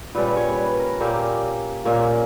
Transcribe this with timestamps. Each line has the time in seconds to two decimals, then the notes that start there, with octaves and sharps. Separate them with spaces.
0.15 A#2 G3 C#4 B4
0.37 C#5
0.57 B4
0.79 A#4
1.00 A#2 A#3 C#4 G4
1.85 A#2 A#3 C#4